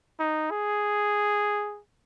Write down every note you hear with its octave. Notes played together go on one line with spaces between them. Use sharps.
D#4
G#4